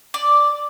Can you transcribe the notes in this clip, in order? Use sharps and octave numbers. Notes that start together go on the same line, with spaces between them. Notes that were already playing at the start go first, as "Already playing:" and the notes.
D5